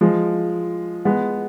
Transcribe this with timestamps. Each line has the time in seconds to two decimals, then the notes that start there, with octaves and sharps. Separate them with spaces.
0.01 F3 G#3
1.05 G#3 B3